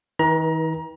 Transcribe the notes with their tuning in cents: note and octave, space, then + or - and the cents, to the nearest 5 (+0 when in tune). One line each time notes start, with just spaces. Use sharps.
D#3 +45 B4 -30 A#5 +25